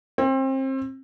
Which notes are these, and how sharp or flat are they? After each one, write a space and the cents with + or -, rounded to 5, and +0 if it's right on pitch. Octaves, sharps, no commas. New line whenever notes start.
C4 +30